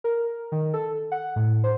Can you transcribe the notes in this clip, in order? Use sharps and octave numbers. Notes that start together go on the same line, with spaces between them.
A#4
D#3
A4
F#5
A2
C5